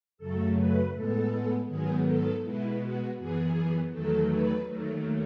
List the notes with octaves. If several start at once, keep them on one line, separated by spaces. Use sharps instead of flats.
F#2 C#3 F#3 A3 A4
B4
A2 G#3 B3 A4
G#2 D#3 F#3 B3 G#4
A4
B2 G#3 B3 E4
F#4
F#2 E3 B3 G#4
E2 D#3 F#3 A3 A4
B4
D#2 D#3 F#3 A3